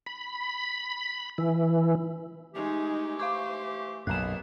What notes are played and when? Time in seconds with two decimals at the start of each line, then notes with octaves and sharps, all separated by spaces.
0.06 B5
1.38 E3
2.55 E3 G#3 A3 D#4 G4
3.20 C5 F5 C#6 D6
4.07 B1 F#2 A#3 B3 F#6 E7